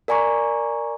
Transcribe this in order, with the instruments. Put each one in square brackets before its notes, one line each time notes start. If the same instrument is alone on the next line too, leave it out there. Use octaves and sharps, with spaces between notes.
[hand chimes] A#4 D5 G#5 A#5 C#6